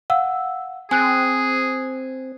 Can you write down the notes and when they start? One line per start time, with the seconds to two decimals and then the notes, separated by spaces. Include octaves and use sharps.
0.10 F5 F#5 E6
0.91 C4 G#4 G#5 D#6 F#6